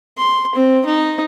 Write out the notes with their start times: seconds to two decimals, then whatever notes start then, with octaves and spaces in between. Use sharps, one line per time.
0.18 C6
0.55 C4
0.85 D#4